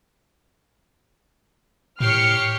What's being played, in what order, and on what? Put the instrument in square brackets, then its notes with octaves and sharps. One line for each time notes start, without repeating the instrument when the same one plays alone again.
[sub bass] A2 [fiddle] G4 C#5 [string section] F6 C7 C#7